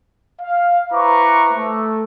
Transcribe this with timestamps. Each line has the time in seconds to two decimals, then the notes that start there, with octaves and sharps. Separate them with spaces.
0.41 F5
0.93 E4 B4 C5 A#5 C#6 D6
1.53 A3